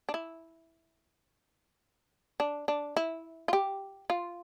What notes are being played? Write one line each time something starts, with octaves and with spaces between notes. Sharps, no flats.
D4
E4
D4
D4
E4
F4
G4
F4